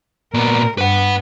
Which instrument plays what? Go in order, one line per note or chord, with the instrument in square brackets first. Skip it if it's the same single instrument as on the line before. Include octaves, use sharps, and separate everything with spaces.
[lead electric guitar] A#2 B3 [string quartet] A#4
[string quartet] G2 [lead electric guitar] B4 F#5